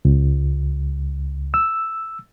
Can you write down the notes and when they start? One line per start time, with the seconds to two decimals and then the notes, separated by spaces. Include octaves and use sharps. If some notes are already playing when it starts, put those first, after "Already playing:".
0.05 C#2
1.54 E6